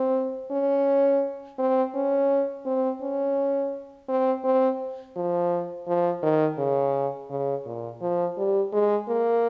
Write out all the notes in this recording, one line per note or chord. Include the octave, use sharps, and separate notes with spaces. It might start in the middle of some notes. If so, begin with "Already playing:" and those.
Already playing: C4
C#4
C4
C#4
C4
C#4
C4
C4
F3
F3
D#3
C#3
C#3
A#2
F3
G3
G#3
A#3